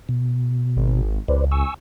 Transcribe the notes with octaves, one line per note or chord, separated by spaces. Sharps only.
B2
G#1
C#2 B4 C5 D5
G#5 C#6 E6